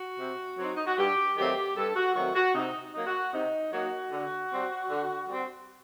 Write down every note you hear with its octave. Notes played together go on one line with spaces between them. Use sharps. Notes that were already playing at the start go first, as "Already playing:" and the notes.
Already playing: F#4
C3
F#3 C4 D#4
D#4
F#4
G2 G4
D#3 F#3 A3 C4 G4
G2 A4
F#4
D#3 F#3 A3 C4 F#4
F#4
C3 D#4
F#3 A#3 D#4
F#4
C3 D#4
F#3 A#3 D#4 F#4
D3
G3 C4
D3
G3 C4